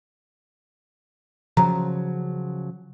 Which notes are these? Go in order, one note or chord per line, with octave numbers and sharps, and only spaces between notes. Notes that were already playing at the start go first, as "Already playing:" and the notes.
C#3 F3 F#3 A#5